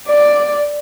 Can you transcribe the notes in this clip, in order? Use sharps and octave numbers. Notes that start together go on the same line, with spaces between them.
D5